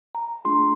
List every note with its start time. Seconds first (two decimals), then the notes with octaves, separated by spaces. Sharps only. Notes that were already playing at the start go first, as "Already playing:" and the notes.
0.15 A#5
0.45 A3 D4 F4 G#4 C6